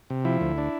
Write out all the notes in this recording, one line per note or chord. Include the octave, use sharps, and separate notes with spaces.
C3
F3 E4
D2
D4